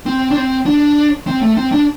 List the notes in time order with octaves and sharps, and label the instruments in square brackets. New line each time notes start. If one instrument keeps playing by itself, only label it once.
[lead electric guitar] C4
D4
C4
D4
C4
A3
C4
D4